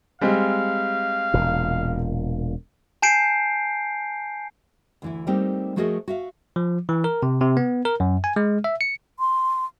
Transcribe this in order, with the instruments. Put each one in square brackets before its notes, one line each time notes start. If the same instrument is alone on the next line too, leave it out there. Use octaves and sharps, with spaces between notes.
[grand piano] G3 G#3 C4 [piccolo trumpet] F5
[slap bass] E1 A#2
[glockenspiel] G#5 A5 G6 C7 D7
[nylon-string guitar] D2 E3 E4
G3 A3 A#3 C4 D#4 G4
F3 A3 F#4 G#4 A#4 D#5
F#4 E5 F5
[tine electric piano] F3
E3
A#4
C3
C3
B3
A#4
F#2
G#5
G#3
E5
C#7
[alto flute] C6